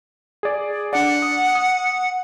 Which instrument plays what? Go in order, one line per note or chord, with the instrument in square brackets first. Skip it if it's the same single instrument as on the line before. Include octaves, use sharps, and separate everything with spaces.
[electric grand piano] G#4 D5
[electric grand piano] D4 D5 [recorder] F#5
[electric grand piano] D#6
D#6